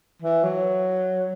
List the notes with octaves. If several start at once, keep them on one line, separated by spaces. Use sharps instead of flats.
E3
F#3